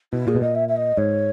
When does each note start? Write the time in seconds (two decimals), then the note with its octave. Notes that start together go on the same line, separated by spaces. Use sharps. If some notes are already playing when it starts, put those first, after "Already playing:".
0.13 B2 E4
0.27 A#2 G#4
0.35 B2
0.41 A#2 D#5
0.55 E5
0.68 E5
0.76 D#5
0.97 G#2 C#5